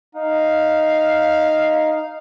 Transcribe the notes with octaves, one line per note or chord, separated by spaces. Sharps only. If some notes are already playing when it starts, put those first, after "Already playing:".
D#4 F5